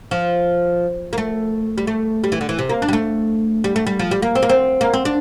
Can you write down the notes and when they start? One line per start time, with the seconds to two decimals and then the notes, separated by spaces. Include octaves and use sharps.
0.11 F3
1.13 A#3
1.18 A3
1.78 G3
1.87 A3
2.24 G3
2.32 E3
2.41 D3
2.49 E3
2.59 C3
2.69 A#3
2.82 D4
2.88 G3
2.93 A3
3.64 G3
3.76 A3
3.87 G3
3.99 F3
4.11 G3
4.22 A#3
4.35 C4
4.42 A#3
4.49 C4
4.81 A#3
4.93 C4
5.05 D4